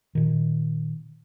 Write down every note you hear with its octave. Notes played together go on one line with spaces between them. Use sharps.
A#2 D#3